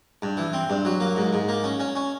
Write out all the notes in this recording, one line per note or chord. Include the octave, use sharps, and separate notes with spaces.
G2
E3
C4
G2
F#3
A#3
G#2
G#2
A#3
C#4
C#4
C#4